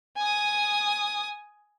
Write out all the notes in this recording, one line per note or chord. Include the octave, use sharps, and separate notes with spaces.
G#5 D#6